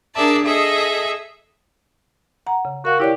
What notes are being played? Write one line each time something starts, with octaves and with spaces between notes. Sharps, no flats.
D4 G#4 A#4 D5 E5 A5
G#4 A4 D#5 E5
F#5 A#5
C#3
F#4 A#4 F5
E4 G4 C#5 D5